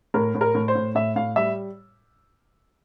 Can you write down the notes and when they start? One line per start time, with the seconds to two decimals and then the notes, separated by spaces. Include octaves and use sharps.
0.14 A2 A#4
0.35 A2
0.41 A#4
0.55 A2
0.68 C5
0.75 A2
0.95 A2 E5
1.16 A2 F5
1.36 G3 E5